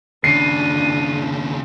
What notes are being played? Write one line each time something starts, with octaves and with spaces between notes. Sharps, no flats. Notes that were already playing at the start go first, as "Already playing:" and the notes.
D#2 C#3 D4 C7 D#7